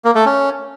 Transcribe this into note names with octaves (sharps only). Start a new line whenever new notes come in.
A#3
A3
C#4